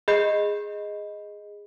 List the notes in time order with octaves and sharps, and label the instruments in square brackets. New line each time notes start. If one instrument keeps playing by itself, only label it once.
[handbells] G#4 D#5 B5 G6 C7